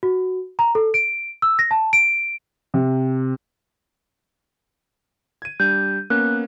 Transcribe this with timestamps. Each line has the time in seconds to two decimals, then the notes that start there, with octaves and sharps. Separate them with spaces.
0.03 F#4
0.59 A#5
0.75 A4
0.94 D7
1.42 E6
1.59 A#6
1.71 A5
1.93 D7
2.74 C3
5.42 G#6 D#7
5.60 G3 D4 G6
6.10 A#3 B3 C#4 F#6